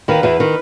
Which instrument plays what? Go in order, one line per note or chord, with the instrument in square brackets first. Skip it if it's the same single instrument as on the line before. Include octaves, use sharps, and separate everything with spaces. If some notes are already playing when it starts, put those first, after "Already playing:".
[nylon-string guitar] D#2 D#3 [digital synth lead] B4
[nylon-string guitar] E2 E3
D#3